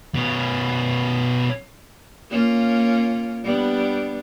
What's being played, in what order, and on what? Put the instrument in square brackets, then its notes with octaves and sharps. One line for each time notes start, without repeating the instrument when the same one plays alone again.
[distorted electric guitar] B2 C#4
[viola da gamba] A#3 C#4 F4
G3 B3 D4